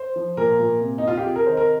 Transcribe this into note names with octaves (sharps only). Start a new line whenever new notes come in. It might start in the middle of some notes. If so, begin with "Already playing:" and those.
Already playing: C5
F3
A#2 A#4
A#2
C3
D#4
C3 F4
G4
C3 G#4
A#4
D#3 C5
A#4